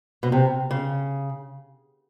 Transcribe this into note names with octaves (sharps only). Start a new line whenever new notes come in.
B2
C3
C#3